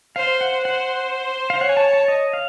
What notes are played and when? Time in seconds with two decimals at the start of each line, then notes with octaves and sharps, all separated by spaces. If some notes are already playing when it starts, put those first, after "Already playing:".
0.16 C5 F5
0.41 F#5
0.65 C5 F#5
1.50 F5
1.61 C#5 F#5
1.69 G#5
1.77 A5
1.93 A5
2.08 D#5
2.33 F5